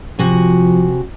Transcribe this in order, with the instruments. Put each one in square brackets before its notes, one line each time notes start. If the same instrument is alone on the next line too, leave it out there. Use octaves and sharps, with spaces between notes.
[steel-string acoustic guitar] C3 F#4 G#5 [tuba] F3